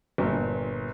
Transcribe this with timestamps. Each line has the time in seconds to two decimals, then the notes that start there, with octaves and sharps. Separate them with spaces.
0.18 G1 A#2